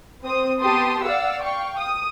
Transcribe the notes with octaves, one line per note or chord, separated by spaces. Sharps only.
C4 C5 D#6
B3 G4 A5 C6 D#6
D5 F5 F#5 E6
F5 G5 C#6
D#6